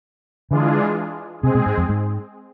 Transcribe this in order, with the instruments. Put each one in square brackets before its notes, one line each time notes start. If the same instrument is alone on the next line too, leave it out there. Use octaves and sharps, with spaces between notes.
[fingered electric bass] D3 [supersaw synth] E3 G#3 D4 F4 G#4
[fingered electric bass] C3 [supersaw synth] G#3 C4 G#4
[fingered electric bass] B2
G#2
F2
G#2